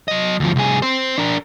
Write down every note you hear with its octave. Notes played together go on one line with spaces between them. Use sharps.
F#3 D#5
D2 F3
C2 G#4
C4 C5
D4 A#4